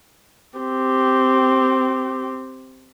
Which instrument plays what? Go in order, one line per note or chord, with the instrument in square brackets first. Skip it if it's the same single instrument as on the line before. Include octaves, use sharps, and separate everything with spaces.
[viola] C4 G4